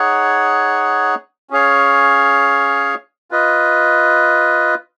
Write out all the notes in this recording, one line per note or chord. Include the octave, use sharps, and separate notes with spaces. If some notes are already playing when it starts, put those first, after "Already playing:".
Already playing: D#4 G#4 C#5 F#5
C#4 G#4 C#5 F5
F4 B4 D#5